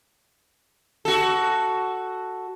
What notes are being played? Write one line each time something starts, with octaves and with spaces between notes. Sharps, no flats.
F#4 A4